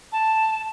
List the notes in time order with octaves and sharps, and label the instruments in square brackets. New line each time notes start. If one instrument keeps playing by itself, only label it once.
[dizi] A5